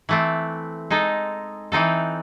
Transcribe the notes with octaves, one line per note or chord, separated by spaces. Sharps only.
E3 A3 C4
G#3 D#4 A4
E3 C4 D#4 A4